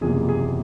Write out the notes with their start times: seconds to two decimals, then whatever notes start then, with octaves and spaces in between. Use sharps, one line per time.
0.01 F#1 E2 C3 F3 A#3 G#4
0.29 G#4